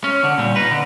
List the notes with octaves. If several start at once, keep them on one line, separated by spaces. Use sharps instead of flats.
C#4
D3
A#2 G3
D#4 B4
D3